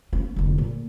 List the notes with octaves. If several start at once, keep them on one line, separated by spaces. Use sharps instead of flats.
B3 C#4
F1 D3
A#2